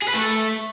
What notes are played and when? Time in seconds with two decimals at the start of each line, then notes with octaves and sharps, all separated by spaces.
0.02 G#4
0.08 B4
0.14 A3